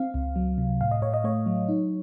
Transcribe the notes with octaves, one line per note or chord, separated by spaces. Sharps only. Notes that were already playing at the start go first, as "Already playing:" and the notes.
Already playing: C4 F5
C#2
F#3
C3
A2 F5
D#5
A2 C#5
D#5
A3 C#5
F#3
D#4